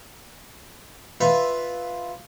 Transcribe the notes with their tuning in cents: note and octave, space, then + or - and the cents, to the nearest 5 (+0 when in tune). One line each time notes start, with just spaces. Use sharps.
F4 +0 B4 +0 E5 -5